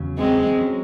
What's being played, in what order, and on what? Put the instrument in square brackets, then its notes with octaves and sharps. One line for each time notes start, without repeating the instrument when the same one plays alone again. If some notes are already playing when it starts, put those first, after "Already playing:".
Already playing: [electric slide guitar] E2 C#3 F#3
[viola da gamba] G#3 C4
[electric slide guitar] F#3 C#4